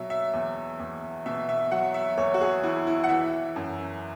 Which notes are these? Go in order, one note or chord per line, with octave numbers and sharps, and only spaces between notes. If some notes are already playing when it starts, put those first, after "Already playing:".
Already playing: B2 F#3 E5
E5
E2
E2
B2 E5
E5
F#3 F#5
E5
E2 C#5
F#4
G#4
E2 E4
E4
F#5
E3 E5
F#2